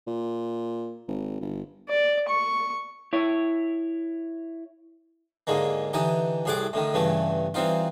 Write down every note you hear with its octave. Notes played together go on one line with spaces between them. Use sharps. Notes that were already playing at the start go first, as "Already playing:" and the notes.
A#2
G#1
G1
D5
C#6
E4 C#5
D#2 G#2 D3 G#3 A#3
D3 E3 D#4 G4
C2 A2 G#4 F#5 A5 D6
A2 D3 D#3
G2 C#3 E3 A3
E3 G3 C4 D#4 F4